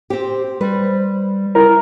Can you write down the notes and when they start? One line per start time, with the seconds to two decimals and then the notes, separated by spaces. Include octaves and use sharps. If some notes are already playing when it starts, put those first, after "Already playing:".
0.10 C4 G4 C5
0.61 G3 B4
1.55 E4 A#4